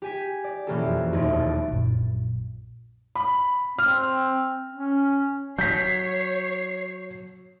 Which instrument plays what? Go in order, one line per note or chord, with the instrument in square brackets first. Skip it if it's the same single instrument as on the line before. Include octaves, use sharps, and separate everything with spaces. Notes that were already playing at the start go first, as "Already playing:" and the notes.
[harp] G4 G#5 B6
D5
B2 E3 A#3 C#4 G4 A4
F2
E1 D#2 A#2 A3 A#3 D7
D6 A6
[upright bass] A#1 F#2
[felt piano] B5
[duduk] C4 [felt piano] F6
[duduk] C#4
[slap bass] F#3 [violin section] C#5 C7 [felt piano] G6 B6